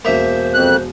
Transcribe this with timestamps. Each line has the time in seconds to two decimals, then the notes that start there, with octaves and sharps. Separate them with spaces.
0.05 E1 A#3 C5 E5 F7
0.54 F2 F#6